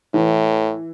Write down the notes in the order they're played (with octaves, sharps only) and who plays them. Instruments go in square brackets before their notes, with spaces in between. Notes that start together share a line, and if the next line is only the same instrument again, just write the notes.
[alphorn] A2 [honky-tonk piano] E3